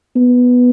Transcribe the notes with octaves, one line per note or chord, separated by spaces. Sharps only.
B3